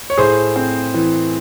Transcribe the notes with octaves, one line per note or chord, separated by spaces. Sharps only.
C#5
A2 G#4 C5
C4
E3